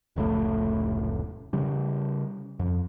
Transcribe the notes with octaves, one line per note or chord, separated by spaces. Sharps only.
F1 C#2 A2 A3
C#3 G3
F2